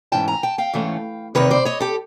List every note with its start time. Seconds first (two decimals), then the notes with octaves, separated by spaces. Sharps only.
0.12 G#2 E3 A3 C#4 G5 A5
0.28 G#5 A#5
0.43 G5 A5
0.58 F5 G5
0.73 G#2 E3 A3 C#4
1.35 E2 C3 D#3 B4 C#5
1.51 C5 D5
1.65 C#5 D#5
1.80 G4 A4